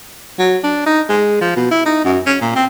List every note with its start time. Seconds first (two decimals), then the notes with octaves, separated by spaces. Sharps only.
0.39 F#3
0.64 D4
0.86 D#4
1.08 G#3
1.41 F3
1.56 B2
1.71 E4
1.85 D#4
2.04 F#2
2.26 C#4
2.42 A#2
2.55 C4